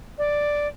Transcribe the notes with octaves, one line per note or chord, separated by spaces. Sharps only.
D5